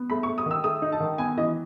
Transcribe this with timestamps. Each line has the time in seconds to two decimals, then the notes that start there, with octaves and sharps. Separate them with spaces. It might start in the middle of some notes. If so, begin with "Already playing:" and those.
Already playing: B3
0.10 A3 B5
0.23 C#6
0.28 A3
0.38 D#6
0.46 D#3 E6
0.64 A3 D#6
0.82 D#4
0.92 A5
1.00 D#3
1.18 B3 G#5
1.37 E3 D#5